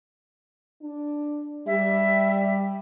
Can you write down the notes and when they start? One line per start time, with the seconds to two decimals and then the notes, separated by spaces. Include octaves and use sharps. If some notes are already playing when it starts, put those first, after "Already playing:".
0.82 D4
1.67 G3 E5